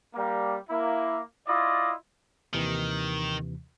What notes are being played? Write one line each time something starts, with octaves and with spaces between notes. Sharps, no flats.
G3 A#3
A#3 E4
E4 F4 D5 D#5
D#2 C3 D#3 E3